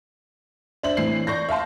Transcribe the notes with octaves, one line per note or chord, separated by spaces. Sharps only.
D4 C5 E5 F#7
A2 E3 C4 C7
D5 C#6 G6 A#6
E5 F5 A5 C6